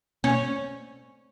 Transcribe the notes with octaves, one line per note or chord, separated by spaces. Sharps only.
C#4